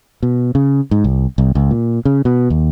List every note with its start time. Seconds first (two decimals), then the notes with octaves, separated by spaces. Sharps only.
0.23 B2
0.55 C#3
0.91 G#2
1.04 C2
1.38 C2
1.55 C#2
1.71 A#2
2.05 C#3
2.25 B2
2.50 D#2